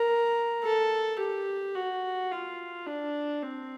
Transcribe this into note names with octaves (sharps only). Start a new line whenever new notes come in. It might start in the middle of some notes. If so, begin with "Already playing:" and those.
Already playing: A#4
A4
G4
F#4
F4
D4
C4